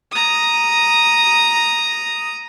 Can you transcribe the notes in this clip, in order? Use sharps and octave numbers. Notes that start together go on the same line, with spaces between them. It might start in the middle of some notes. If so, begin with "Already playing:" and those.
A#5 D#6